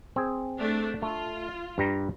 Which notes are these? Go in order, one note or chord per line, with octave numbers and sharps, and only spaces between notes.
C4 G#4
A3 D4
A3 F4
G2 G3 A#5